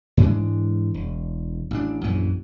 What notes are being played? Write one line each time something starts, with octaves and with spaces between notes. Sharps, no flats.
G#2 E3 G#3 D4
E1
A1 D4
A#1 F#2 E3